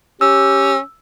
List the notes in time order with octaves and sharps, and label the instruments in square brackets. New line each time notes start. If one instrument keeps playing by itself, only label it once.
[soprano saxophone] C#4 [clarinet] G4 [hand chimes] E6